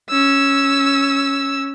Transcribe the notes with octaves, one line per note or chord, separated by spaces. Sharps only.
C#4 E6